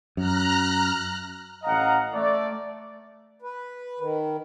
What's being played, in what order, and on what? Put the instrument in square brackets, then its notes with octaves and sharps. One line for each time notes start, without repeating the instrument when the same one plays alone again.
[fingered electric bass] F#2 [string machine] A#5 F6 F#6
[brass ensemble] A1 D#5 F5 F#5 A#5
A3 D5
[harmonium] B4
D#3